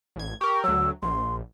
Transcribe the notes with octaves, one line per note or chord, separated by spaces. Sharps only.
A1 G#6
G4 A#4 C#6
D2 F#3 E6
A#1 C6